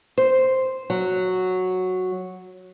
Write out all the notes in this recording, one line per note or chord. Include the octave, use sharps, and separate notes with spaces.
C5
F#3